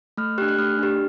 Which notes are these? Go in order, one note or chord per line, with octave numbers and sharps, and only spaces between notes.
A3 F6
D4 G4 F#6
F#6
A3 F6
D4 G4